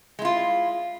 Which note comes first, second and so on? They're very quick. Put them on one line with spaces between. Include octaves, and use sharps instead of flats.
G#3 E4 F4